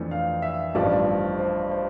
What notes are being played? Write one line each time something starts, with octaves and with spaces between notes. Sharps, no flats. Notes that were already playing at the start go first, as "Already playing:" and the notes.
Already playing: F2 E3 A3 D4
F5
E5
A1 G2 F3 C4 D5
C5
C5